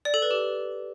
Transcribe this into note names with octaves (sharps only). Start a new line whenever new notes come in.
D5
A4
B4
G4